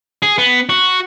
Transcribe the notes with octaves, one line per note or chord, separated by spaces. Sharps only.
G#4
B3
F#4